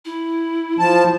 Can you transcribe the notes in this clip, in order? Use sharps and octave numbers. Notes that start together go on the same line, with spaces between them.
E4
F3 A5